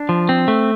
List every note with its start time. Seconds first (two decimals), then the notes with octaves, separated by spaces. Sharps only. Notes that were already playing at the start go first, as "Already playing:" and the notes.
Already playing: D4
0.09 F3
0.29 C4
0.48 A3